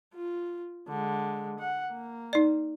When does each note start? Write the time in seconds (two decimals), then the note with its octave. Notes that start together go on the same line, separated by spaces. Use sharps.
0.14 F4
0.88 D3 G#3
1.59 F#5
1.90 A#3
2.33 D#4 D5